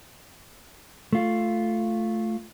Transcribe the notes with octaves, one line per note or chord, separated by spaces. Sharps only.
A3 F4